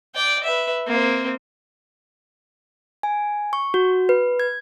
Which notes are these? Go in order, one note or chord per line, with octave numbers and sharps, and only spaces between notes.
D5 G5
B4 E5
A#3 C4
G#5
C#6
F#4
B4
G#6